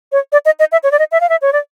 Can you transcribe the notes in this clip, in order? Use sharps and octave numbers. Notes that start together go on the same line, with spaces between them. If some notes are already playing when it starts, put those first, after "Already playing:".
C#5
D5
D#5
D#5
E5
C#5
D5
D#5
E5
F5
E5
C#5
D5